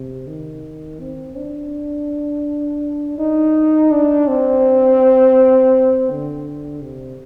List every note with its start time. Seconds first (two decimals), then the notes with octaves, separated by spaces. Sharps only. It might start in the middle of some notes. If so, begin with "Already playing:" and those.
Already playing: C3
0.27 D#3
1.00 C4
1.37 D4
3.19 D#4
3.91 D4
4.28 C4
6.10 D3
6.82 C3